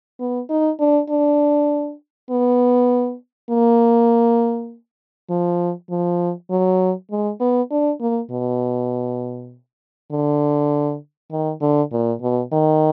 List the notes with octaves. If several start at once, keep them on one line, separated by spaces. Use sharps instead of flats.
B3
D#4
D4
D4
B3
A#3
F3
F3
F#3
G#3
B3
D4
A#3
B2
D3
D#3
D3
A#2
B2
D#3